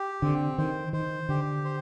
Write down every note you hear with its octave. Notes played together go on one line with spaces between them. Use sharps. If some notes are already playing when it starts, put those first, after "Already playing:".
Already playing: G4
D3 C4
D#3 C5
D#3 C5
D3 G4
C5